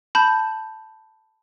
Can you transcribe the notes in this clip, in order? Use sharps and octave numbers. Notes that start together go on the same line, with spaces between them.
A5 B5 G6